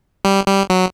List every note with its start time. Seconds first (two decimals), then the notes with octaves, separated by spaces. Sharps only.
0.25 G3
0.47 G3
0.70 F#3